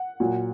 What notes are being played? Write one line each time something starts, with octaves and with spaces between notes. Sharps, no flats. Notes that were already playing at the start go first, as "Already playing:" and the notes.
Already playing: F#5
A#2 F#3